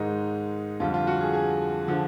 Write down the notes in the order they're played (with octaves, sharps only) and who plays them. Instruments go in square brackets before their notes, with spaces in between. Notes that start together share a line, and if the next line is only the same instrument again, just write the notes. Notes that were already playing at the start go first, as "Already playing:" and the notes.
Already playing: [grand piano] G#2 D#3 G#3 D#4
F2 D3 G3 F4
F4
F#4
G#4
G#4
D3 F3